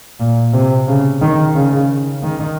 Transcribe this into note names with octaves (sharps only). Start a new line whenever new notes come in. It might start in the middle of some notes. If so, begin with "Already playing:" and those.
A#2
C3
C#3
D#3
C#3
D#3